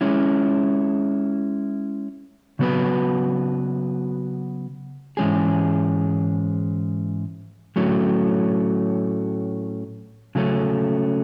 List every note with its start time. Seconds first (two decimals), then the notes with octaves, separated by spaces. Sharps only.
0.01 G#3 C#4 E4
2.59 C#3 F#3 B3 F#4 B4
5.17 G#2 E3 G#3 C#4 G#4
7.76 A2 F#3 A3 C#4
10.35 C#3 F#3 A3 C#4